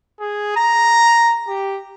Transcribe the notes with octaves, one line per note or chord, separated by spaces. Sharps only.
G#4
A#5
G4